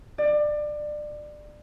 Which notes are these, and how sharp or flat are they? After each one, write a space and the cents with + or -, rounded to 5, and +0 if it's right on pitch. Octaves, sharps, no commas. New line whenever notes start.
D5 +25